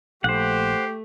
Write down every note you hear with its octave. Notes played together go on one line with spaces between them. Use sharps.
A#1 A3 G4 C5 F#5